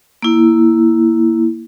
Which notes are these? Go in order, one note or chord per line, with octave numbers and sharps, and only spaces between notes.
A#3 E4